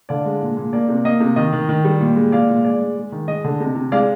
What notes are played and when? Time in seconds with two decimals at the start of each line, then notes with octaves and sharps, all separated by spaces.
0.09 D3 D5 F5
0.25 G#3
0.42 A#2
0.57 A#2
0.73 A#3 D5
0.89 C3
1.05 A#3 D#5
1.20 C3
1.36 D#3 D#5
1.53 D#3
1.69 D#3
1.85 G3
2.01 A#2
2.16 G#3
2.32 A#2 D5 F5
2.49 A#2
2.65 G#3 D5
2.80 G#3
2.97 G#3
3.12 D#3
3.28 G#3 D#5
3.44 D3
3.60 C3
3.75 C3
3.92 G#3 D5 F5